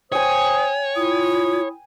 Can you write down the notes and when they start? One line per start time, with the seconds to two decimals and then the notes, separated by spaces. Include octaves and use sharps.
0.12 C5 C#5 G5 G#5 D#6
0.96 E4 F4 D#6